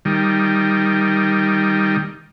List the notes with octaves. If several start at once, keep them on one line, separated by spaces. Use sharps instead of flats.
D#3 G3